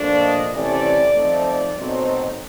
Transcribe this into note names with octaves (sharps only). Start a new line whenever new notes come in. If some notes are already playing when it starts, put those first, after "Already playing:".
Already playing: A#2 F3 A3 D4
D#5
C3 E3 A3 C#4 D5
F3 A3 C4 D#4
D5
B2 F#3 A3 C4 D#4